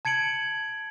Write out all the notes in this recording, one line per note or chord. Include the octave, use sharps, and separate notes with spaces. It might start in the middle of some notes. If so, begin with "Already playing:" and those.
A5 G#6 C#7 D7 F#7